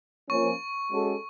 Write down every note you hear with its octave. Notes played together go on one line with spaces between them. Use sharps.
F3 A#3 C#4 C#6
G#3 C#4 F#4 A4